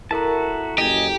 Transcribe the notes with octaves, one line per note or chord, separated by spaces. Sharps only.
E4 F#4 A4 A#4 E5 A5 A#5
F#1 G4 D#5 G#5